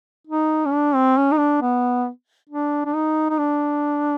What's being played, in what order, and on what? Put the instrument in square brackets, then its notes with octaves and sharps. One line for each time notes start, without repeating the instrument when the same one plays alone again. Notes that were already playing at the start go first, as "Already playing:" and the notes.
[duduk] D#4
C#4
D4
C4
C#4
D#4
D4
B3
D4
D4
D#4
D#4
D4